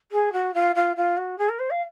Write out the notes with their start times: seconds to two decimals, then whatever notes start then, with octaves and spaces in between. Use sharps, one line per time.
0.11 G#4
0.32 F#4
0.54 F4
0.75 F4
0.96 F4
1.17 F#4
1.38 G#4
1.48 A#4
1.59 C5
1.70 F5